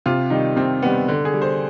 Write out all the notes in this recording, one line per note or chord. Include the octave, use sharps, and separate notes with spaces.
C3 F4
D#3 G3 D#4
C3 C4
D#3 G3 B3
D3
G#4
G3
C5